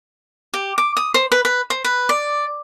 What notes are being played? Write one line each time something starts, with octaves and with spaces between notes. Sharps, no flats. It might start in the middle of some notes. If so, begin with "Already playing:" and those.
G4
D6
D#6
C5
B4
B4
C5
B4
D5